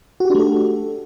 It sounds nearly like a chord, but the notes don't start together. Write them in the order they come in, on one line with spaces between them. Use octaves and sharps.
F#4 G4 D4 A3 A4